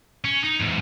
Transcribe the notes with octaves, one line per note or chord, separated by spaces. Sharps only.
C#4
D#4
E2 G#2